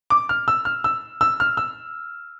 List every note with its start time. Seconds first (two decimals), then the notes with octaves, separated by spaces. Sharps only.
0.10 D6
0.29 F6
0.48 E6
0.65 F6
0.84 E6
1.21 E6
1.40 F6
1.57 E6